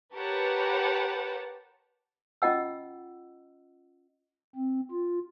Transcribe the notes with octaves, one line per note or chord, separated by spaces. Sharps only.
G4 A#4 B4 C#5 F#5 A5
C#4 F4 D#5 F#5 E6
C4
F4